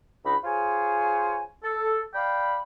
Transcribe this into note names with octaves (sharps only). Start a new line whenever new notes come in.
C#2 D4 D#4 B5
F4 G#4 C5 C#5 G#5
A4
D5 F5 G5 B5